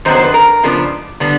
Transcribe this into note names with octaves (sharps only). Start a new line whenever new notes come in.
F#2 D#3 F#3 B3 D4 C5
C5
B4
A#4
C#3 F3 G#3 B3 D4
D3 G3 B3 D4